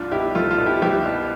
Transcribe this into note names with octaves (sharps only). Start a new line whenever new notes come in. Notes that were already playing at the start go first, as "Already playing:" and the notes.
Already playing: C2 D4 F4
B2 E4 G4
C2 F4 A4
F4 A4
B2
E4 G4
C2 E4 G4
B2